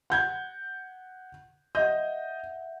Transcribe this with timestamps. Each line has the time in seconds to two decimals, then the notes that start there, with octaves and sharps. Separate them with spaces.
0.10 F#5 G6 G#6
1.75 D#5 E5 F#5 G6